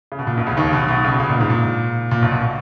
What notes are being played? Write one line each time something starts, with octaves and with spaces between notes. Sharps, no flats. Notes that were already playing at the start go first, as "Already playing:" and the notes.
C#3
B2
A#2
B1 B2
C#2 C#3
D#2 D#3
B1 B2
B1 B2
C#2 C#3
B2
C#2 C#3
A#2
G#2
A#2
A#2
B1 B2
A#2
B2